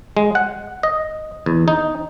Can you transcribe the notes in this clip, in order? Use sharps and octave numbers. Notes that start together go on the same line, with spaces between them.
G#3
F#5
D#5
E2
D#4